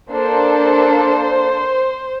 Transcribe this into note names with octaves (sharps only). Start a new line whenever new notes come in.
A#3 D4 A4 C5